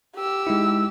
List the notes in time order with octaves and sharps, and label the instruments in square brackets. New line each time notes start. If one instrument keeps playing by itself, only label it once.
[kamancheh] G4 E6
[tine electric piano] G#3 D#4 E4